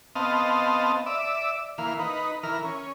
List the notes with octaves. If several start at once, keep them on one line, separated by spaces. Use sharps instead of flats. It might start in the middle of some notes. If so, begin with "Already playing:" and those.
B3 C4 D#5 F5 A5
D5 E5
E3 A#3 F5
D#4 B4
E3 A#4 F6
C#4